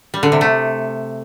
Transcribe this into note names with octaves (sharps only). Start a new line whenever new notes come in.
G3
D3
C3
A3